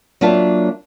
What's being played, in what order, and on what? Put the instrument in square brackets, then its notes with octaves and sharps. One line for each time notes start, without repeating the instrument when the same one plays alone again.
[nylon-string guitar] F#3 A#3 D4 F4 E5 A5